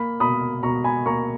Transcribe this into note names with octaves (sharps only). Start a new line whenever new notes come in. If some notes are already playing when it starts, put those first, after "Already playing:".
Already playing: A#3 B5
B2 B5 D#6
B2 A#5 C#6
G#5 B5
A#3 A#5 C#6